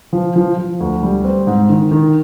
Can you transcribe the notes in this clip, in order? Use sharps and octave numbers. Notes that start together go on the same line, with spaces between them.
F3
F3
F3
D2
G3
C4
G#2
D#3
D#3